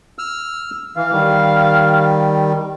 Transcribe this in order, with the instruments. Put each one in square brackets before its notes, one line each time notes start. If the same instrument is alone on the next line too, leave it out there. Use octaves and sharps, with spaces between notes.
[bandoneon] E6 F6
[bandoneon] E3 [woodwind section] F5
[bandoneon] D#3 G3